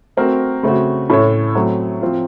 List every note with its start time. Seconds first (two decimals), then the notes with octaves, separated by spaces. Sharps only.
0.17 A3 C4 F#4 A#4
0.63 C#3 A3 C4 F#4
1.10 A2 A3 C#4 A4 C#5
1.55 F#3 A3 C4
2.01 F3 C4 F4